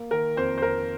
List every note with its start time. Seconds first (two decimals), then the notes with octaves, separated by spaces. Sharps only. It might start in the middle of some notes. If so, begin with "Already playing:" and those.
Already playing: A#3
0.11 D#3 A#4
0.36 F2 C5
0.58 C5
0.62 F2 A#4